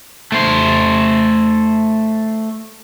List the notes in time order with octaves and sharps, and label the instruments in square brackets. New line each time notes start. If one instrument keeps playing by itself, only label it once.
[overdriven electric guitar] A3 C5